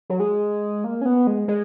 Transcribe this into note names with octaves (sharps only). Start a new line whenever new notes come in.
F#3
G#3
A#3
C#4
B3
G#3
G#3